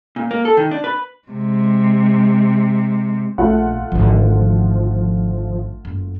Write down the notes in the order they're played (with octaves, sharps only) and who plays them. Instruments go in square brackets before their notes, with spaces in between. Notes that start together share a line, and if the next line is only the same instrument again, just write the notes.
[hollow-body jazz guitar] A#2
A#3
A4
D#3
D4
B4
[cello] C3 G#3
[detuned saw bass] A#1 [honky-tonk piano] A3 F4 F#5
[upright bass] G#1 D3 [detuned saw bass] F3
[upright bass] F#1